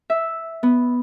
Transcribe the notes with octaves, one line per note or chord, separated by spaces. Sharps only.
E5
B3